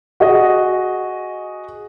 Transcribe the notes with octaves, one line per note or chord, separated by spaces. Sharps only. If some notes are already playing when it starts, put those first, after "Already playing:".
F#4 G#4 D#5